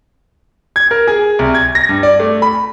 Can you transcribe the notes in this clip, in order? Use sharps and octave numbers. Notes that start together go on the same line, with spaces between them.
G#6
A#4
G#4
C2
G#6
A#6
G2
D5
A3
B5